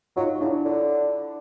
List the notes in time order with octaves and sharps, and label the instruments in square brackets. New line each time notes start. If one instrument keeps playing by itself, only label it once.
[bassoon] F#3 [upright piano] D#4 F4
[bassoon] C#3 [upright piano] D4 E4
[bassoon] D3